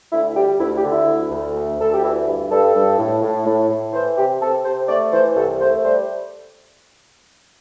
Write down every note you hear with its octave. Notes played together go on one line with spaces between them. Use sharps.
D2 E4
G3 G4
D2 E4
G4
D3
E4
D2
D2
A3
D2 A4
G4
E3 E4
G2
G2 A4
G2
A2
A2
A2
A2
E3 C5
C3 G4
C3 A4
C3 C5
A3 D5
E3 C5
C2 A4
A3 C5
G3 C5